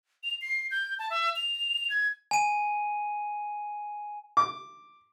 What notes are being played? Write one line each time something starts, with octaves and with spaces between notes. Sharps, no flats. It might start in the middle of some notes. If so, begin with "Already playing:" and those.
F7
C7
G6
A5
E5
F7
G#6
G#5 D#7
D6